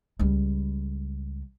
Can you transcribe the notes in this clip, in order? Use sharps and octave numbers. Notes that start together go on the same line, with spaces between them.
C#2 G3